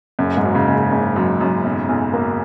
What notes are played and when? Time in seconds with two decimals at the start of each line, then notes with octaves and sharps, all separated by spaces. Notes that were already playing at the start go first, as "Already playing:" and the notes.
0.19 F#1 F#2
0.37 G#2
0.43 F#2
0.55 C#3
0.67 F#1
0.92 F#1
1.16 F#2
1.41 F#2
1.65 B1
1.89 B1
2.13 A#3